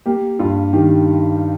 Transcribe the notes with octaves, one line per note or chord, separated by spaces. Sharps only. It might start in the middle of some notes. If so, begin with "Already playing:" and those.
A#3 G4
G2 F4
D#3 G4